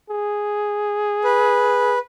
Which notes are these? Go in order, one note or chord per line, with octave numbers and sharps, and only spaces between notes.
G#4
B4